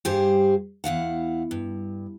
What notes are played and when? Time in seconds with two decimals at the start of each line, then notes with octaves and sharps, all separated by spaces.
0.05 G2 G3 G4 G#4 C5
0.84 E2 E4 F5 F#5
1.51 G2